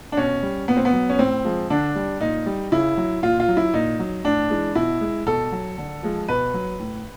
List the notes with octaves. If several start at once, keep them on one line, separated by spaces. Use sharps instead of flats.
D4
B2 C#4
G3
A#2 B3
C4
B3
F#3
C#4
A2 C4
F3 G#3
D3 D4
G3
A#2 D#4
G3
C#3 E4
F#3
A#2 F4
F4
F#3
E4
A#2 D#4
F#3
A2 D4
E3 G#3
B2 E4
G#3
B2 A4
F#3
D3
F3 G#3
B2 B4
F#3
A2